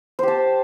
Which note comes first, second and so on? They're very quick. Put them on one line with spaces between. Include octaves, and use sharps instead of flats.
C5 G4 A5